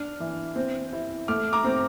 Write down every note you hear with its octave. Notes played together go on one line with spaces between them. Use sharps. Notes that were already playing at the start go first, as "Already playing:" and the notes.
Already playing: D4 F6
E3
C4
E4
A3 D6 F6
A#5 D6
C4